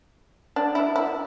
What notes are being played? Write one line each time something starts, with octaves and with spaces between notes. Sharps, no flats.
D4
E4
E4